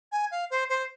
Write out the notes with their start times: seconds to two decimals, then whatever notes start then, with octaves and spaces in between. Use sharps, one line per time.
0.12 G#5
0.31 F5
0.50 C5
0.69 C5